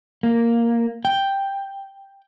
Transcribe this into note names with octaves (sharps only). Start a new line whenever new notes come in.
A#3
G5